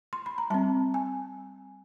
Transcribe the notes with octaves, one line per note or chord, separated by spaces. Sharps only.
C6
B5
A#5
G3 C4 A5
G#5